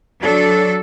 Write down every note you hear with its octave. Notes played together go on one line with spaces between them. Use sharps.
F#3 D4 A4